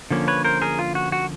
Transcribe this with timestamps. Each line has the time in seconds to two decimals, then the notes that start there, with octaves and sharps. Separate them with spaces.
0.11 D3 F3 A#3 C#4
0.28 B4 C#5
0.45 A#4 C5
0.62 G#4 A#4
0.79 F4
0.95 F#4
1.12 F#4